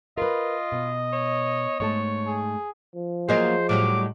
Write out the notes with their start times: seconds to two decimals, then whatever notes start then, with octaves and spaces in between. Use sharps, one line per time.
0.18 F4 A#4 B4 D#5
0.72 B2
1.13 C#5
1.80 G#2 A3 C#5 A5
2.27 G#4
2.95 F3
3.29 F#3 A#3 F4 G#4 C5 D#5
3.69 A2 F#3 G3 D6